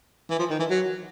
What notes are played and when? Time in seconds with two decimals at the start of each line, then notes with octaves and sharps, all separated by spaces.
0.30 E3
0.39 F3
0.50 D#3
0.59 E3
0.70 F#3